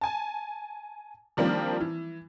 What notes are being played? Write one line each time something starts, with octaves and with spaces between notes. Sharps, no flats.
G#5 A5
D#3 F3 G3 A#3 C4 D4
E3